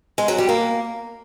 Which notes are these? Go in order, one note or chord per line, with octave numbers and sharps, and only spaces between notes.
G#3
F#3
G3
A#3